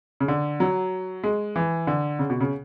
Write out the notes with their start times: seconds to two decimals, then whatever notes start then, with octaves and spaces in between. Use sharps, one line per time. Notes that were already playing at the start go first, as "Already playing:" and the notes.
0.20 C#3
0.28 D3
0.60 F#3
1.24 G#3
1.56 E3
1.87 D3
2.19 C#3
2.30 B2
2.41 C#3